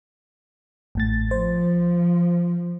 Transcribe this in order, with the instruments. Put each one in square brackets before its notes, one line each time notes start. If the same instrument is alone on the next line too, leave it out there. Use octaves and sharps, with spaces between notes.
[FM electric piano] A1 A2 A6
[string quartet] F3 [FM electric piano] C5